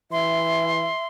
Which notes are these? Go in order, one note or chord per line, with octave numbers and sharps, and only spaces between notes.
E3 E5 C6